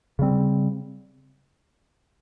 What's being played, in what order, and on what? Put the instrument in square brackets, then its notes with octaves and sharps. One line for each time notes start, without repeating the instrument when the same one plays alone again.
[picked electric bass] C#3 G3 C4